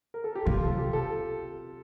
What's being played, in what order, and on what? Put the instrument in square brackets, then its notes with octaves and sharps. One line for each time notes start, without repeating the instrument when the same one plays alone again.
[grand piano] A#4
A4
G4
[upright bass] C3 [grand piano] F4
[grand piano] A4
G4
A4